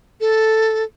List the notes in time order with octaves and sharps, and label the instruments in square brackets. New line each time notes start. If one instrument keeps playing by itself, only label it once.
[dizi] A4